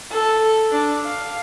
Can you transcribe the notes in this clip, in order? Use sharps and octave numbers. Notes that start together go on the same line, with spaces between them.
A4
D4
F5